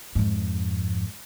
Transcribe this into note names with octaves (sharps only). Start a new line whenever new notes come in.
F2 G#2